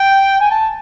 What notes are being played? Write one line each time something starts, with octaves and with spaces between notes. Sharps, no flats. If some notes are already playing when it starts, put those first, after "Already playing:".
Already playing: G5
G#5
A5